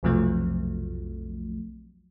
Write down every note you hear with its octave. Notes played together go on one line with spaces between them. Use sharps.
B1 F2 C3 F3 F#3 A3